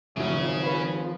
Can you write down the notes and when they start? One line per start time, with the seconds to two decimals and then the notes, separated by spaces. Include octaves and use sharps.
0.16 G#1 A2 C#3 F3 F#3 C#4
0.64 B4